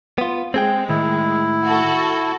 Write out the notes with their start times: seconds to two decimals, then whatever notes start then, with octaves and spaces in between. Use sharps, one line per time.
0.18 B3 F4
0.54 G#3 C4 G#4 G5
0.89 A2 D#3 E4
1.63 F#4 A4